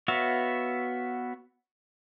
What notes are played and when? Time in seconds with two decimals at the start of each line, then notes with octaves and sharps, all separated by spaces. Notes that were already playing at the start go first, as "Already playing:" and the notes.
0.08 B3 F#4 C#5 E5 F5